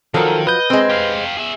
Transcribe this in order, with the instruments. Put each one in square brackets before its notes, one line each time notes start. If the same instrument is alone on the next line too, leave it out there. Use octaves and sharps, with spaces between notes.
[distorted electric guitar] D#3 [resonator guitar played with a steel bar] F3 F#3 [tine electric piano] A4 A#4
[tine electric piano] B4 G6 [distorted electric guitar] D#5
[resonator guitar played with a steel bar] G#3 C4
[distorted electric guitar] G4 F5
G#4 E5